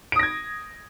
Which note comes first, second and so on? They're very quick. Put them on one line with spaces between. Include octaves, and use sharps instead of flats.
D7 D#6 A#6 G#6